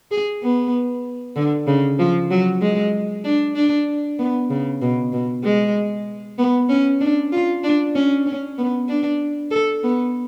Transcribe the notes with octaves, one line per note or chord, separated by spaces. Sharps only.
G#4
B3
D3
C#3
F3
F#3
G#3
D4
D4
B3
C#3
B2
B2
G#3
B3
C#4
D4
F4
D4
C#4
C#4
B3
D4
A4
B3